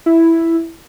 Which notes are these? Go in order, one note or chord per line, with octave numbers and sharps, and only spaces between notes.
E4